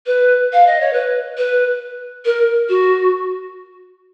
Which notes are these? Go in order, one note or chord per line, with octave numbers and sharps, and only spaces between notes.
B4
F5
D#5
C#5
B4
B4
A#4
F#4